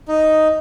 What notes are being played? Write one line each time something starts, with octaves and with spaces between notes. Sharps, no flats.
D#4